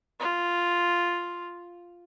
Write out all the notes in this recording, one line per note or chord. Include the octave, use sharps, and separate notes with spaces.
F4